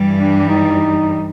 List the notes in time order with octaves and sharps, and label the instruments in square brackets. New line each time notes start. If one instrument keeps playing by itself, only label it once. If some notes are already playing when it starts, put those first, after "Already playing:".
Already playing: [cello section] G2 E3 G3
[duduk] D4
D#4